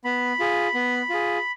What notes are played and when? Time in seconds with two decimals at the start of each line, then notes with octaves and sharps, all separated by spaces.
0.05 B3 B5
0.39 F4 G#4
0.74 B3
1.10 F4 G#4